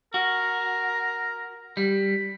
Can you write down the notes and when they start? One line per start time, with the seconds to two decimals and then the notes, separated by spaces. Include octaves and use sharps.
0.14 F#4 A#4
1.77 G3 B5